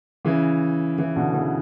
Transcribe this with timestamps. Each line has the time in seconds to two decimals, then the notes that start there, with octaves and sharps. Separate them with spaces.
0.25 C#3 E3
0.98 C#3 E3
1.16 B2 D3
1.34 C#3 E3